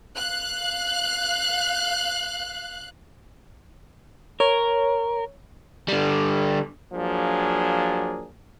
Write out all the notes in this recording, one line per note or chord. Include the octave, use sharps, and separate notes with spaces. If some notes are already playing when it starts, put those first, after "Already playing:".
F5 F#6
A#4 C#5
D3 G3
F3 F#3 A#3 D4 G#4